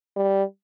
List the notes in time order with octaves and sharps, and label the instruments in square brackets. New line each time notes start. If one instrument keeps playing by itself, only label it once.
[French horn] G3